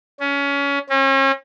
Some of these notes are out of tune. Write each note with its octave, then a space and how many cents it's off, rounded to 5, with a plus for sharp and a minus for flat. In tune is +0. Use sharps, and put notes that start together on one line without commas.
C#4 +25
C#4 -40